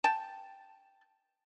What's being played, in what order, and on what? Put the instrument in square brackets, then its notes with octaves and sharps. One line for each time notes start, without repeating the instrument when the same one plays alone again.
[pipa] G5 A5